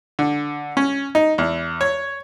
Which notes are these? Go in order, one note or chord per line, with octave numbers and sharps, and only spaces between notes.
D3
C#4
D#4
E2
C#5